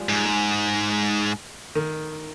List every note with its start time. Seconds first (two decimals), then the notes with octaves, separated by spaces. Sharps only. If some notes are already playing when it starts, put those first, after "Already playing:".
Already playing: F3 G3 G#3
0.09 G#2
0.25 G#3
1.75 D#3